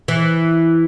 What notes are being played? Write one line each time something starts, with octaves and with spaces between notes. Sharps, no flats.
E3